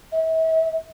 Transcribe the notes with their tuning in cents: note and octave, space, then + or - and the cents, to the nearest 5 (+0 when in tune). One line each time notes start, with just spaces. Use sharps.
E5 -40